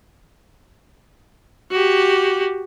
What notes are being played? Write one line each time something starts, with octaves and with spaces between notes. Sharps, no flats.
F#4 G4